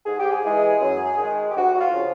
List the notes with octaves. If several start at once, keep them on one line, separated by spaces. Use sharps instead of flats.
G#2 G#4
G4
G#4
E3 G#3
F#2
D#3 G#3
G4
D2 F#4
F#4
F4
C#3 F3